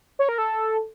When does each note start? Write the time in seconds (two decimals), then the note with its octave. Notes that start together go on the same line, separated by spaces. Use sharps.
0.19 C#5
0.29 A#4
0.38 A4